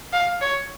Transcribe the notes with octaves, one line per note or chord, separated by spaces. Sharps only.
F5
C#5